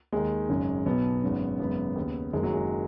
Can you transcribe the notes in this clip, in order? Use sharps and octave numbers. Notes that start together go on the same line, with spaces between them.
D#2 D#3 G#3
G#1 F#2 C#3
B1 B2 B3
G#1 F#2 C#3
G#1 F#2 C#3 B3
D#2 C#3
F#1 F#2 D#3 G#3
F#3
G#3